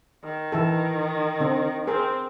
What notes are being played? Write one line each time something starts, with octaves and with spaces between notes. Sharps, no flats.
D#3
E3 E4 A4
D3 C4
C4 G#4 A#4 C5